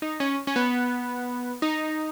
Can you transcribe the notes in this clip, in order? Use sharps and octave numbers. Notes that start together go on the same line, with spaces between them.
D#4
C#4
C#4
B3
D#4